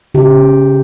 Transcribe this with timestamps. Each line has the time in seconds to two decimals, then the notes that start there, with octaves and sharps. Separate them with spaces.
0.14 C#3 G4